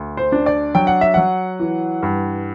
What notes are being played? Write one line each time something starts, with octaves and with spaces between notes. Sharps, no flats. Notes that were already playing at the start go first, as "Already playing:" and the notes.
Already playing: D2
C5
D4
D5
F#3 G5
F#5
E5
F#3 F#5
E3
G2